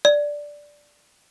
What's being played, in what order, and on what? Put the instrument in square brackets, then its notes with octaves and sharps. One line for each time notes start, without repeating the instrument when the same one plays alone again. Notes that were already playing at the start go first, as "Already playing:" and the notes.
[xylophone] D5